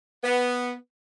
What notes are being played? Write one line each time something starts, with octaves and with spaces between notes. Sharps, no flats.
B3